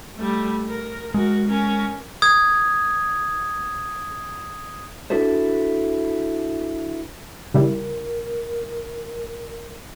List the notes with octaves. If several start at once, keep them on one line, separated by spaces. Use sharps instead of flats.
G3 A3
A#4
G#3 F#4 A#4
C#4 A#4
D#6 G#6
D4 E4 F#4 A4 B4 C5
C#3 G3 E4 A#4